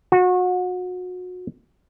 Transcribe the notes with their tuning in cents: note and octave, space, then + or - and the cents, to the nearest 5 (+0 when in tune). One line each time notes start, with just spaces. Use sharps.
F#4 -30